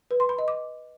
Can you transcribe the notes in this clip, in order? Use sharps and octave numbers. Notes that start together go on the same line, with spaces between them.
B4
C6
B5
D#5
D6